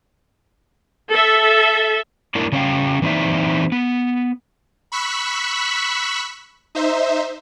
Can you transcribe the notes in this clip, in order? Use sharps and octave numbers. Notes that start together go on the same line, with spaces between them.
A4 E5
A#3 D4 E4 A#4 D5
C#3 C#4 C#5 F5 G5
E3 A#3 C4 D#4 D5 E5
B3
B5 C#6 E6 F#6 B6
D#4 C5 E5